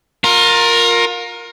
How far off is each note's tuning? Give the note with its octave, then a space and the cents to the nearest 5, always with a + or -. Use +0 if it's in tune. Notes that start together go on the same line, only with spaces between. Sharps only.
F4 +30 A#4 +0